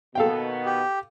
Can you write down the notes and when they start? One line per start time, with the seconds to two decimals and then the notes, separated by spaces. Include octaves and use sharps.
0.15 B2 D#3 B3 A4 F5 G5
0.66 G4